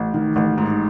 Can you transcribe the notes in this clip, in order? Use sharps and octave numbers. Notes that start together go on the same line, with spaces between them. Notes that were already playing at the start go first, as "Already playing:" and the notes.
Already playing: A1
D#3
A1
G#2